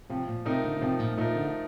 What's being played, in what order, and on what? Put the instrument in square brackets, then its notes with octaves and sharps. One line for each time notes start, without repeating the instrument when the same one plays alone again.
[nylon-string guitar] C3 [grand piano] F3
[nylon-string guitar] A#2
[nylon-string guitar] C3 [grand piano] A3 D#4 A#4
[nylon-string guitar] D3
D3
[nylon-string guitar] C3 [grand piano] F3
[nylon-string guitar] A#2
[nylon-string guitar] A#2 [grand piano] A3 D#4 A#4
[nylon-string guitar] D3